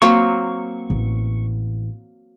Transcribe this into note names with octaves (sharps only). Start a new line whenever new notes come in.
F#3 A#3 C4 C#6
A1